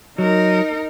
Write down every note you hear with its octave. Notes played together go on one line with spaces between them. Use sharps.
F#3 D#4 A#4